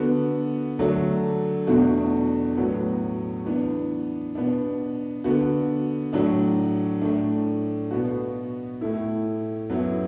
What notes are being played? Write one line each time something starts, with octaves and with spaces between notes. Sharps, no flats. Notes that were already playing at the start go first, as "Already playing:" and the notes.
Already playing: D3 B3 F#4
D3 F#3 A3 D4
E2 B2 A3 D4 F#4
A2 F#3 B3 F#4
E3 B3 D4
B2 B3 D4
D3 B3 F#4
A2 F#3 D4
A2 A3 D4
B2 B3 F#4
A2 A3 E4
F#2 F#3 B3 E4